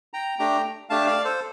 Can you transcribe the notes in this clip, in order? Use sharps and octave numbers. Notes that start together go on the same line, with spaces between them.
G5 A#5
A3 D4 G4 G5 A#5
A3 D4 G4 F5 A5
D5 F5
A4 C5